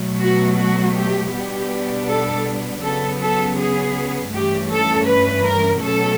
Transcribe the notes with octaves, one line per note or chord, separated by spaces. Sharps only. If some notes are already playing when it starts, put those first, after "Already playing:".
Already playing: B2 F#3 A3
F#4
F#4
G4
B2 G3 B3 D4 G4
A4
C#3 F#3 B3 A4
A4
G#4
G2 E3 A3 C#4 G4
A4
B4
A#4
B2 F#3 A3 C#4 A4